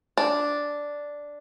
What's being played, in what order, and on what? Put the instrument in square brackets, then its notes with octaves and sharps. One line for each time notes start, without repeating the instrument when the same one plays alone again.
[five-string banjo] D4